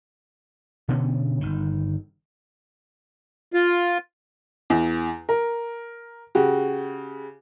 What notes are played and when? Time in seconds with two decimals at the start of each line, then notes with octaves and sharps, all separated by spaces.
0.88 B2 D3 B3 C#4
1.41 G1 D#3
3.54 F4
4.70 E2
5.29 A#4
6.35 C#3 F#4 G4